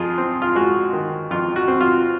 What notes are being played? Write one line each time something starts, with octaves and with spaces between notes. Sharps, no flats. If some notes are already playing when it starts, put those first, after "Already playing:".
Already playing: F2 F4 G#4
C4
F4
G#3 F#4
D#3
F2 F4
F#4
C4
F4